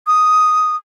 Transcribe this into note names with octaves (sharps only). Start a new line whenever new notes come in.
D#6